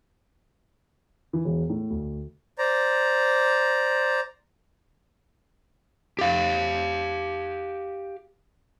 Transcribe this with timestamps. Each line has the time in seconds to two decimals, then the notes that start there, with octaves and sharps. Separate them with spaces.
1.33 E3
1.45 E1
1.70 A2
1.90 D2
2.58 C5 D5 A#5
6.19 G4 F5